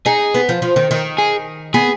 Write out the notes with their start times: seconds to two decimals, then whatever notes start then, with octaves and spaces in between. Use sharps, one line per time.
0.06 D#4 G#4
0.34 B3
0.49 F3
0.62 F3
0.76 D#3
0.91 D#3
1.18 G#4
1.74 B3 G#4